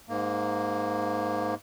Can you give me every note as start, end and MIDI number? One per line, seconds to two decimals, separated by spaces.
0.09 1.55 44
0.09 1.55 58